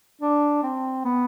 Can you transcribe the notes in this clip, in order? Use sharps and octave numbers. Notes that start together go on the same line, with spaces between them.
D4
C4
B3